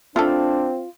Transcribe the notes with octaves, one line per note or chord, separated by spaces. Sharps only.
A3 C4 D4 E4 F4 A4